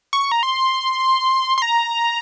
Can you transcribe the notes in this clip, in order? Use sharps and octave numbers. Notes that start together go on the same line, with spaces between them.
C#6
A#5
C6
C6
A#5